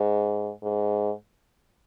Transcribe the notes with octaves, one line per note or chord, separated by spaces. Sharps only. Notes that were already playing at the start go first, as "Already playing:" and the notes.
Already playing: G#2
G#2